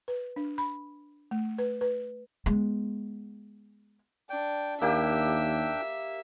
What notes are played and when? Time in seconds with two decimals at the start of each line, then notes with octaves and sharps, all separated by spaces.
0.08 B4
0.36 D4
0.58 B5
1.31 A3
1.58 B4
1.81 B4
2.46 G#3 B3
4.30 D4 G5
4.82 D#2 A#3 D4 G4 E5 G5 E6